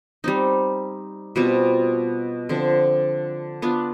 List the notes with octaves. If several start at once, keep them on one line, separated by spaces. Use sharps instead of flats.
G3 C4 D#4
B2 G3 C4 F4
D3 F3 C4
B3 D4 F4